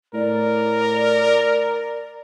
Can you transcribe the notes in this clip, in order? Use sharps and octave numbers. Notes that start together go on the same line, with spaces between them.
A2 A#4 D5